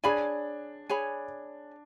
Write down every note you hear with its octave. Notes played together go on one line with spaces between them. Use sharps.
D4 G#4 C#5 G#5 B5
G#4 C#5 G#5 B5